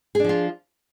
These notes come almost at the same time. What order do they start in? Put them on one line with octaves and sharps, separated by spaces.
G#4 D4 F3 F4